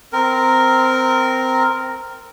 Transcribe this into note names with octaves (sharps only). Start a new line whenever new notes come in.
C4 A#4